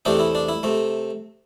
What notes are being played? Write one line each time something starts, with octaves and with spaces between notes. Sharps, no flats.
E2 C3 A3 D4 G4
E4
D4
E4
C3 A3